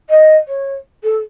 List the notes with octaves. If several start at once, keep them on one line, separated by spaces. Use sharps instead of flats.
D#5
C#5
A4